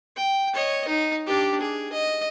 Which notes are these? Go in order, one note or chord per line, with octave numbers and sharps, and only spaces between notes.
G5
C#5 D#5
D#4
D4 G4
G#4
D#5